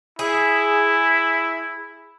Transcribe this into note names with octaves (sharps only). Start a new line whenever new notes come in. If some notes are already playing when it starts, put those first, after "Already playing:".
E4 G#4